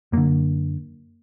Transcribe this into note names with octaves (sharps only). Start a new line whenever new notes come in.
F#2 D3 A#3